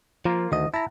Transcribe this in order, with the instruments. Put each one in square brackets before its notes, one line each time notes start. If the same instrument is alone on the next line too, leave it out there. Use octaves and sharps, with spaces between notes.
[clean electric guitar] F3 [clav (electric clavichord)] A#3 F4 A#4
[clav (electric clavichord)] D2 [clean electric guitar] D#3 D#5
[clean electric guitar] E4 [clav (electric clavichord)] A5 A#5